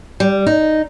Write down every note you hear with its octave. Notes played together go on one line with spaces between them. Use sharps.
G3
D#4